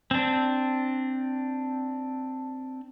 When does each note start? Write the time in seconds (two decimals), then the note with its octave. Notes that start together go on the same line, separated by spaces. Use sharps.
0.11 C4 D4